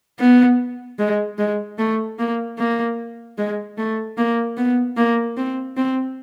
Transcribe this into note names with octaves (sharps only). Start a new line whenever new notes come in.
B3
G#3
G#3
A3
A#3
A#3
G#3
A3
A#3
B3
A#3
C4
C4